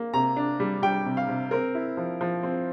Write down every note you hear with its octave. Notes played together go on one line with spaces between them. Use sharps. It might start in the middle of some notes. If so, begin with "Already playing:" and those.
Already playing: A#3
C3 A#5
D4
G3
G3 G5
C3
F5
C3
C4 A#4
E4
F3
F3
C4